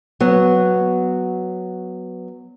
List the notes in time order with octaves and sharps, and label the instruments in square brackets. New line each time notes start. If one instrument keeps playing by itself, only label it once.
[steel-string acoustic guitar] F#3 B3